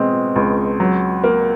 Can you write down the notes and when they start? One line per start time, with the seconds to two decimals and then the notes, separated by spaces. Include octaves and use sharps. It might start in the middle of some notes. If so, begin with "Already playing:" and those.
Already playing: B2 G#3 C4
0.36 C#2
0.80 F#3
1.24 A#3